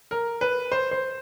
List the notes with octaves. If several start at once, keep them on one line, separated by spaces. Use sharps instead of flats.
A#4
B4
C5
C5